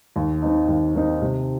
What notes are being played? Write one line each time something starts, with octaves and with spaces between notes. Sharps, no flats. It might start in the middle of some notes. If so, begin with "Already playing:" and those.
D#2
D#3 C4 D#4
D#2
D#3 C4 D#4
C3